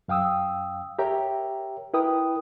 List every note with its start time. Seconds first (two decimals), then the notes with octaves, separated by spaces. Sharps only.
0.08 F#2 F5 G5 D#6 E6
0.99 G4 A#4 C#5 E5 G5 A#5
1.94 E4 A#4 B4 G5 D#6